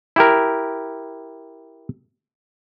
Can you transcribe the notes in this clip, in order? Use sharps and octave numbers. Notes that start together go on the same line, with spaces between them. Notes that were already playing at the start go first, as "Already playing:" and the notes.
E4 G4 A#4